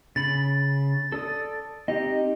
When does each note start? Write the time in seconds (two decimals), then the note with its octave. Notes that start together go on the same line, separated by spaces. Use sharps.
0.16 C#3 B5 A6
1.12 A4 D5 D#6
1.88 C4 D#4 G4 D#5